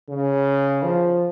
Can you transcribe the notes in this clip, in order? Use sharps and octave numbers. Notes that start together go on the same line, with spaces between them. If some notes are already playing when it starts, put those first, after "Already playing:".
C#3
F3